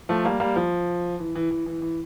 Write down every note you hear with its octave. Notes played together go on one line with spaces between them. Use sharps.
F3 A3
G3 A#3
G3 A#3
F3
E3
E3
E3
E3
E3